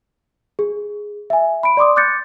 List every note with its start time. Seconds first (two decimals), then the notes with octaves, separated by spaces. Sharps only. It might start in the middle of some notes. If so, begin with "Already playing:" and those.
0.59 G#4
1.30 E5 G#5
1.63 B5 D7
1.77 D5 C6 D6 D#6
1.96 D6 F#6 G6 A6 C#7